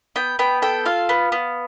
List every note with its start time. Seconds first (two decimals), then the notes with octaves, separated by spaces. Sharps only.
0.16 B3 G5
0.39 B3 G5
0.62 A4 G5
0.85 F4 F5
1.09 B3
1.32 B3